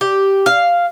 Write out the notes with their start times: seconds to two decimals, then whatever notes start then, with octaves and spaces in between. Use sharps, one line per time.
0.01 G4
0.46 F5